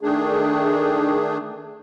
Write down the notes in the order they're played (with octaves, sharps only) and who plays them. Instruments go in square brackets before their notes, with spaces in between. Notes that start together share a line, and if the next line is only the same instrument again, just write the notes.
[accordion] D#3 A3 D4 G#4